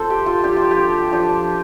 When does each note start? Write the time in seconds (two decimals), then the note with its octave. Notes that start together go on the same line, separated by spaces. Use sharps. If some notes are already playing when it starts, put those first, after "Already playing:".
Already playing: A3 C4 F4 A4 C5
0.10 G4
0.26 F4
0.44 F3 D4 F4 G4
0.57 F4
0.71 G4
1.11 F3 D4 F4